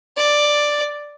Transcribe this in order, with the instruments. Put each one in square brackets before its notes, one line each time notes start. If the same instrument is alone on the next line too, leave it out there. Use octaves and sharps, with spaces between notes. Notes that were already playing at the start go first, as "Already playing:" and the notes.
[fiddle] D5